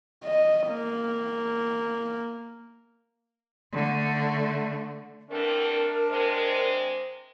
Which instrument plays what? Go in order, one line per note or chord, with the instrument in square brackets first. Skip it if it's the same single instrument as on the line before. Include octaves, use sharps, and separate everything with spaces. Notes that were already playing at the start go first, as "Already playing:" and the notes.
[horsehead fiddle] D#5
A#3
[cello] D3 A3
[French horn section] E2 A3 C4 [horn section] D4 [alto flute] A#4
[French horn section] C3 G#3 [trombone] C5